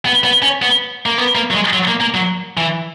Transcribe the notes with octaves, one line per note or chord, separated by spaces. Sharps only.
B3
B3
C#4
B3
A#3
B3
A#3
F#3
G#3
F#3
A#3
A#3
F#3
E3